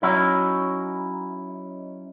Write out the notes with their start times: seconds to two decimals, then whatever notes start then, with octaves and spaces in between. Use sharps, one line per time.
0.02 F#3 C#4 D#4 E4